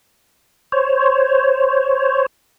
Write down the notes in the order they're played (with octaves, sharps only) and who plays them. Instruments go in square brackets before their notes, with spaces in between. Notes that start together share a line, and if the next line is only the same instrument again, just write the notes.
[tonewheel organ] C5 C#5